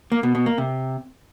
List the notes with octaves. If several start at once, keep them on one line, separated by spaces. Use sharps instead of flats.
A#3
B2
B2
A#3
C3